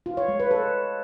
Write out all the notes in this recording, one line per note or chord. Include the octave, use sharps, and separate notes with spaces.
F4
C#5
G#3
B4
A4